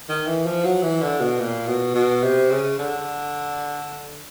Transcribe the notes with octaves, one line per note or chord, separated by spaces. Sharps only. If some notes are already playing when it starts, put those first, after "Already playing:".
D#3
E3
F3
F#3
E3
D3
B2
A#2
B2
B2
C3
C#3
D3